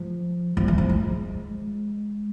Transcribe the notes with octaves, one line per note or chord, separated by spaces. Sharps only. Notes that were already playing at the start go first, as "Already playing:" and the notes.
Already playing: F3
F3
E3
F3
G#3